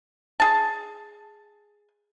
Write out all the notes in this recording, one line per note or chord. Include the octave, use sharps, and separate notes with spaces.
G#4 A5